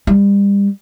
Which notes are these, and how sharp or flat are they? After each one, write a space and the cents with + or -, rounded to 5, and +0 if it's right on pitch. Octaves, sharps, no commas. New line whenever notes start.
G3 +30